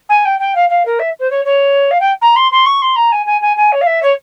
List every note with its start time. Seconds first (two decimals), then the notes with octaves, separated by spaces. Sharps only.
0.09 G#5
0.24 G5
0.39 G5
0.55 F5
0.69 F5
0.85 A#4
0.99 E5
1.19 C5
1.30 C#5
1.44 C#5
1.90 F5
2.00 G5
2.21 A#5
2.35 C6
2.51 C6
2.65 C#6
2.81 C6
2.95 A#5
3.11 G#5
3.25 G#5
3.41 G#5
3.56 G#5
3.72 C#5
3.81 F5
3.86 E5
4.02 C#5